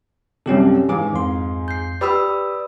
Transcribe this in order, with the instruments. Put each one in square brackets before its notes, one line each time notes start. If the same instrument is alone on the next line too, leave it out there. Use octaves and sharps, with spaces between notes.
[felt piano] C2 F#2 C3 [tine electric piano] C#4 G4 A4
[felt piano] G#2 F5 G#5 [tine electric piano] E3 D6
[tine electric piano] F2 C6
[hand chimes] G6 C7
[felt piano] G4 D#6 [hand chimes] B4 B5 E6 [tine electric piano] D5